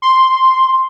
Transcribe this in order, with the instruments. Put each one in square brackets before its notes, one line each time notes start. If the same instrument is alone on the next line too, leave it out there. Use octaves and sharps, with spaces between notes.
[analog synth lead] C6